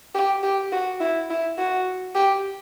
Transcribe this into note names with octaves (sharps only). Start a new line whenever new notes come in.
G4
G4
F#4
E4
E4
F#4
G4